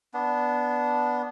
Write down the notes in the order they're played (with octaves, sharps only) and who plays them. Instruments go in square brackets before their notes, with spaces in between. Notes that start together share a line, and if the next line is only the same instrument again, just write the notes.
[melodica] B3 D4